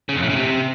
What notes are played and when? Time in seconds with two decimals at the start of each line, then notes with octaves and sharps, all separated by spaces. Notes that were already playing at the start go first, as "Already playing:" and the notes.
0.09 C#3
0.16 F2
0.22 A2
0.29 C#3
0.36 C3